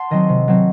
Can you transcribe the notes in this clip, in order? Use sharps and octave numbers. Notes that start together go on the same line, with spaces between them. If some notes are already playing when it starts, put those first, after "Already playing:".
Already playing: F#5 A5 C6
D#3 F#3 C4 D#5
C3
F#3 C4